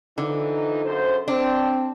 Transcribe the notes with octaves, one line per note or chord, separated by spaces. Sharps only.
D3 E3 F3 D#4
F#2 C#3 C5
C4 D4